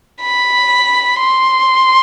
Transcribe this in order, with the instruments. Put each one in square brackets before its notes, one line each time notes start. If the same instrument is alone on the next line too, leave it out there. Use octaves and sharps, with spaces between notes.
[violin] B5
C6